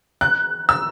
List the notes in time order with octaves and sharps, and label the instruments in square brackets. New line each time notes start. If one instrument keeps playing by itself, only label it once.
[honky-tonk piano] F#6
E6